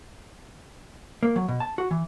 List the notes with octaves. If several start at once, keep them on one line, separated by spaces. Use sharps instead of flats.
A#3
F#3
B2
A5
F#4
E3